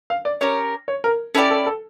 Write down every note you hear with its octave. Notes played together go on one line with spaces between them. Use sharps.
F5
D5
C#4 G4 A#4 C#5
C#5
A#4
C#4 E4 G4 A4 D5
A4
A4